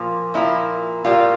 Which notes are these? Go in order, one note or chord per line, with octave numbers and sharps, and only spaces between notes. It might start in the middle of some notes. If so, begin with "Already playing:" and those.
Already playing: A#2 F3 A#3
A#2 F3 A#3 E4
A2 G3 A#3 F4